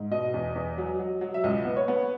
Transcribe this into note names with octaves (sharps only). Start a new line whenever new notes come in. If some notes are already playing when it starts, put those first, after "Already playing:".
Already playing: G#2
B2 D#5
E2
E2
F#3
F#3
F#3
E5
C#2 D#5
B3
C#5
B3